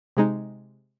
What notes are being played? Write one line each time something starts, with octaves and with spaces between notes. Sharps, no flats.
C3 G#3 D#4